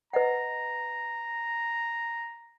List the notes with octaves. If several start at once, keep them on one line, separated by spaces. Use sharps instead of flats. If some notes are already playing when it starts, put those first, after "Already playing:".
B4 D#5 F#5 A#5